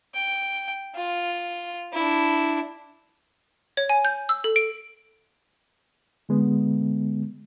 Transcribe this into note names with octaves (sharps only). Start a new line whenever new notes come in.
G5
F4
D4 E4
C#5
G#5
G6
E6
A4
D7
D3 G#3 B3